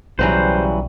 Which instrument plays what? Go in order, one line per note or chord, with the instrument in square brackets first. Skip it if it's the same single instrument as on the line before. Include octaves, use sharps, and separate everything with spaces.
[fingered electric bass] B1 [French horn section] C#3 G3 [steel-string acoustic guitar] E3 F#3 B4 [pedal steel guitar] C5